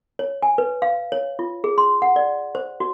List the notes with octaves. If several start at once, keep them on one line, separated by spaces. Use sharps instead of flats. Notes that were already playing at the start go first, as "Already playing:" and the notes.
C#5
G#5
B4
F5
C#5
F4
G#4
C6
F#5
D5
C5
F#4